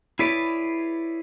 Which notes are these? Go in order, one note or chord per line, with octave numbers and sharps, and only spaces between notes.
E4 G#4 B4 C#5 D5